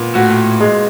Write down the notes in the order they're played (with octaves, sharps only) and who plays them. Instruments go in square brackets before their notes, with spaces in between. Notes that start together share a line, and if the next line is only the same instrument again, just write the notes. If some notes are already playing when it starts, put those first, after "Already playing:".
Already playing: [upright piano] A#2 B3
[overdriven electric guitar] A2 [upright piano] F#4
[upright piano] G#3